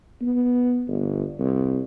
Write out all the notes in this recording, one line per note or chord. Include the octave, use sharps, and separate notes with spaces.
B3
G1
C2